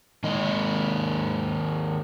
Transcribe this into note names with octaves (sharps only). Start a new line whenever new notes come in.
D#3 G#3 A#3 D#5